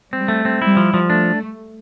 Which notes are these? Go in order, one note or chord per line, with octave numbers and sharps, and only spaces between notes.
G3 C4
A3
C4
G3 E4
F3
F3
A3 D4